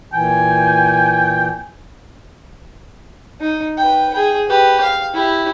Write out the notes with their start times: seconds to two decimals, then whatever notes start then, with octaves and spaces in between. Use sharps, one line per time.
0.13 A#2 E3 G5 G#5
3.40 D#4
3.77 B4 G5
4.14 G#4 G5
4.49 G4 B4
4.83 F5
5.14 E4 G4